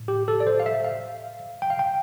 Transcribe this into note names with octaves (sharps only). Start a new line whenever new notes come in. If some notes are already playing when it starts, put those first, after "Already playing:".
Already playing: A2
G4
A4
D5
C5
F5
E5
F5
G5
F5
G5